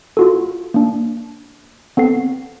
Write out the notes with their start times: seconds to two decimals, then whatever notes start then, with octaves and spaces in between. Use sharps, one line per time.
0.17 F4 F#4 A4
0.74 A#3 D4
1.97 B3 C4 A4 C7